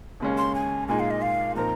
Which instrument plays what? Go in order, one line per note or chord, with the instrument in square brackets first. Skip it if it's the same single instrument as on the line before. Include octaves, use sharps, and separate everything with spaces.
[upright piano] D#2 C#3 G#3 C#4
[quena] C6
G#5
[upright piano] A#2 G#3 D#4 G#4 [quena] G#5
[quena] F5
D#5
F5
[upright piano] A#2 F3 C4 D#4 A#4 [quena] A#5